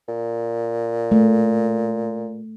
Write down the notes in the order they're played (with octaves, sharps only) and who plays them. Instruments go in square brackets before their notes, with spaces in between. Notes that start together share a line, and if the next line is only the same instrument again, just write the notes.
[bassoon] A#2
[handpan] A3